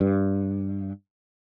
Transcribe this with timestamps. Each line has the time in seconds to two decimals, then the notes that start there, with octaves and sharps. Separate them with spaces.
0.01 G2